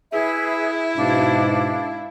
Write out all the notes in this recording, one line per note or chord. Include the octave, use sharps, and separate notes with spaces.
E4 G#4 B4 E5
G#2 B2 D4 F5